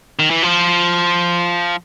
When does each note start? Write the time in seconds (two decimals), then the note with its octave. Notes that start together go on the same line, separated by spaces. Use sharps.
0.19 D#3
0.31 E3
0.43 F3